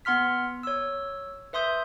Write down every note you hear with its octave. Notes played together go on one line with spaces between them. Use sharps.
B3 F#5 C6 F6 B6
C#5 E6
B4 E5 C6 D#6 G6